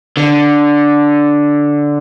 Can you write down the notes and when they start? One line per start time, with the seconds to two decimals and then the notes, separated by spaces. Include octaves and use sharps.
0.17 D3